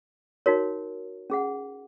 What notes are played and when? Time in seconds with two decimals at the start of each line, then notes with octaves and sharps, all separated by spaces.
0.46 D#4 F#4 A#4 C#5
1.30 C#4 G#4 F#5